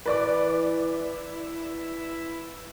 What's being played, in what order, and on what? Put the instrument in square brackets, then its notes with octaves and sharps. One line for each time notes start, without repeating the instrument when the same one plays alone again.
[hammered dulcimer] E3 [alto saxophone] E4 [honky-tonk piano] B4 D5 D6